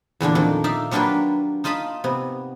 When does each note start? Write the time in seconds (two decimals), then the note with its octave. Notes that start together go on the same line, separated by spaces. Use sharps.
0.20 E2 A#2 D3 D4
0.35 F2 D#3 A#3
0.64 D#4 D5 E5 F5
0.91 F#3 A#3 D4 F4 G4 B4
1.64 D#4 F4 D#5 A5 B5
2.04 C3 B3